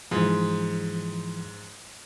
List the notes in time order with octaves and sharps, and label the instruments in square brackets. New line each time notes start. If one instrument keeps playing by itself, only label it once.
[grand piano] G#2 [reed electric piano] E3 F3